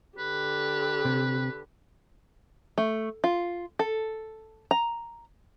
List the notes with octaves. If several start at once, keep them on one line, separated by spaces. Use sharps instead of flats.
D3 G4 B4
C3
A3
F4
A4
A#5